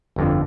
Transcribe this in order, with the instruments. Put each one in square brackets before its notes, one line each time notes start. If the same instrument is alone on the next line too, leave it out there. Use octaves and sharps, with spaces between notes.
[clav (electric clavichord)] G1 F2 D3